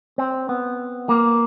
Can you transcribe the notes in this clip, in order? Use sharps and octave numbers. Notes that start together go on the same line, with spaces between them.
C4
B3
A#3